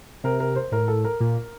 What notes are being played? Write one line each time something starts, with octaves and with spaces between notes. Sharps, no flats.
C3 A#4
A#4
C5
A2 A#4
A4
A#4
A#2